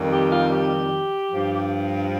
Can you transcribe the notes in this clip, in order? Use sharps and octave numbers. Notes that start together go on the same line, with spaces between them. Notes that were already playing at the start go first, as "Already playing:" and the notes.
Already playing: F2 D#3 G3
G4
F4
G4
G2 F3